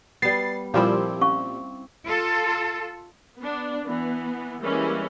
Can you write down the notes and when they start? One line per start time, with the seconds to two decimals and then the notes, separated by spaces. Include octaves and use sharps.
0.22 G3 B3 A6 C7
0.74 A#2 F3 G3 C4 E4 G4
1.21 C#4 F5 C#6
2.05 F4 A4
3.38 B3 D4
3.84 E3 B3
4.62 E3 G3 G#3 A#3 C#4 E4